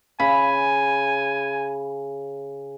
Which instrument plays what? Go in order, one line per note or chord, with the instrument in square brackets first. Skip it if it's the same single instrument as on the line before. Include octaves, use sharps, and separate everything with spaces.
[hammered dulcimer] C#3 [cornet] G#5 [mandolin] B5